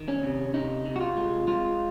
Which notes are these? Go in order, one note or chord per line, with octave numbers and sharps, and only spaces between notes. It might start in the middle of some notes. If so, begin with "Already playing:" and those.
Already playing: D#3
C#4
C3
C3 D#4
C3
F#4
F4
G#3
G#3 F4